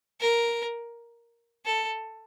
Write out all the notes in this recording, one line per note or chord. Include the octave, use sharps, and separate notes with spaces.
A#4
A4